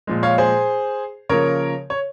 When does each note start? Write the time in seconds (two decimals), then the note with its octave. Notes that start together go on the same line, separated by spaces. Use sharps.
0.07 A#2 F3 G#3
0.23 C#5 F5
0.38 G#4 C5
1.29 C#3 F3 A#3 A#4 C#5
1.90 C#5